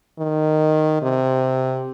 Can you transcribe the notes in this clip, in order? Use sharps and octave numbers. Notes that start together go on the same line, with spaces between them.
D#3
C3